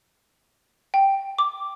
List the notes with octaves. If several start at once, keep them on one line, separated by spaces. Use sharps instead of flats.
G5
D6